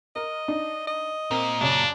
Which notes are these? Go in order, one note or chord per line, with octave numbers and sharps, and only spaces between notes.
A#4 D#5
D4 D#4
D#5
A#2 C4 A#4
F#2 C#3 D4 C#5